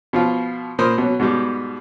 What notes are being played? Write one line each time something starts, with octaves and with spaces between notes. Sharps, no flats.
B2 F3 F4
A#2 A#4 C5 B5 D#6
B2 F#3
G#2 B2 G3